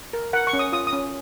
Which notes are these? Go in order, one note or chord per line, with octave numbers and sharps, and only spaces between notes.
A#4
A#4 F#5
C#6
C#4
D#6
F4 D#6
D#6
C#4